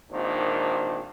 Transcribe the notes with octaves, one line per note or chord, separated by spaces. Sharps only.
G#1 A#2 D#3 D4 C5